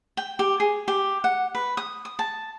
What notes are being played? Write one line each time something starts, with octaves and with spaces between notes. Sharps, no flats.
G5
G4
G#4
G4
F#5
B4
D#6
D#6
A5